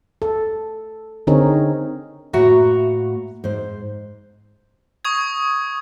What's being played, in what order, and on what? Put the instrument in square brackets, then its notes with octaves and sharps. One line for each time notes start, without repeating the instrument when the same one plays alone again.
[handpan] A4
D3 C4 D#4 G#4 A#4 C#5
[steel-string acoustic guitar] A2 A#3 F#4 E5 F#5 A#5
G#2 C5
[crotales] C#6 D#6 G#6